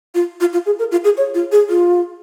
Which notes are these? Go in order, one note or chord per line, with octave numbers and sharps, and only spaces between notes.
F4
F4
F4
G#4
A#4
F4
G#4
C#5
F4
G#4
F4